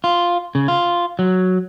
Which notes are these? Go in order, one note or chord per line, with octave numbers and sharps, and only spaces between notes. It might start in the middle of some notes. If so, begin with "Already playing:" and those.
F4
C#3
F4
F#3